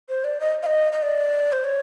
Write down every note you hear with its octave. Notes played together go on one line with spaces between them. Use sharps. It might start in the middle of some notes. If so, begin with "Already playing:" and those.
C5
D5
D#5
F5
D#5
D#5
D5
C5
C#5